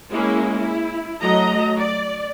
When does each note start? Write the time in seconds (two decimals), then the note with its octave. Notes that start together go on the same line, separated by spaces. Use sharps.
0.11 G#3 A#3 C#4 E4
0.60 E4
1.22 F#3 A3 D#5 A#5
1.76 D5